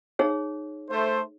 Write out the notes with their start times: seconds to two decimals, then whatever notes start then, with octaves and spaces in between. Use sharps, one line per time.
0.19 D#4 G#4 C#5
0.90 A3 C5